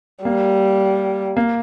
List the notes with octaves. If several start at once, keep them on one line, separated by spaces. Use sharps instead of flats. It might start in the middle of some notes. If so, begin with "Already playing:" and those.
G3 A#3
A#3